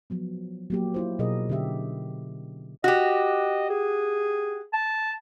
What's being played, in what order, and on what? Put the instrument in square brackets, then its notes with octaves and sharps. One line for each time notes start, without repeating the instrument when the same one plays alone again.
[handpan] F3 F#3 B3
F#3 A#3 G4
E4 F4 C5
B2 F#3 G#4 A#4 D#5
D3 C#4 G4 E5
[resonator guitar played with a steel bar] F#4 G4 [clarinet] D#5
[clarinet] G#4
A5